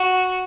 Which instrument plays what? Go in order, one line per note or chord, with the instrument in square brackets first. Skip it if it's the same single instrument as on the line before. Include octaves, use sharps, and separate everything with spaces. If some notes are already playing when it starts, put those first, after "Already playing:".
Already playing: [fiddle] F#4